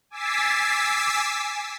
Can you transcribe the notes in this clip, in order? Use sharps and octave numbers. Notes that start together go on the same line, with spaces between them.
G#5 D6 E6 A6 B6 C7